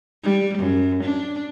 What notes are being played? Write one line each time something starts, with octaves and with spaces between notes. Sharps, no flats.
G3
F#2
D4